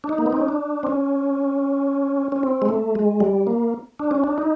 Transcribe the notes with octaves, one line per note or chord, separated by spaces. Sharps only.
D4
D#4
A#3
B3
C4
C#4
D4
C4
C#4
C#4
C4
G#3
A3
G#3
G3
A#3
D4
C#4
D4
D#4